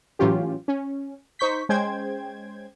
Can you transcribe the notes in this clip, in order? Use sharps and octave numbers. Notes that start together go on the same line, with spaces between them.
A2 E3 F#3 C#4 F4 G4
C#4
D#4 C5 C#6 G6 B6
G#3 C#4 C5 G5 G#6